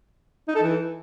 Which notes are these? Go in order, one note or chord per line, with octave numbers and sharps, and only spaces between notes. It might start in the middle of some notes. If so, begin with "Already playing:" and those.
D#4
A4
E3